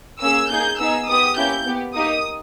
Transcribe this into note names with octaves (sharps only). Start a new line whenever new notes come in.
A#3 C#4 G#4 E6
A#3 D#4 G#4 G6
B3 D#4 G#4 E6
B3 G4 D#6
A#3 C#4 E4 G4 G6
B3 G4
A#3 D#4 G4 D#6